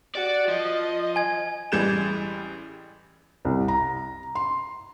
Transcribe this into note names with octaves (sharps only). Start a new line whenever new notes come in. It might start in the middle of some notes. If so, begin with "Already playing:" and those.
F#4 D5
F3 D#5
G#5 G#6
A1 E3 G3 G#4 G6 E7
C2
A#5
C6